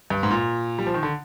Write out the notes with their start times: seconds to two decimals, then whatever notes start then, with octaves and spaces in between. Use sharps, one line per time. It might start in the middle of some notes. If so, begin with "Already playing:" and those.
0.10 G2
0.23 G#2
0.31 A#2
0.79 G3
0.86 F3
0.94 D#3
1.03 D3